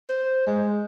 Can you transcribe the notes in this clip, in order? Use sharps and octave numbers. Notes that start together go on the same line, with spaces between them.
C5
G#3